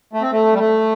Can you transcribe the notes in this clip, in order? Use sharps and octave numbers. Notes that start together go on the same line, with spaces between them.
A3
C4
A3
G3
A3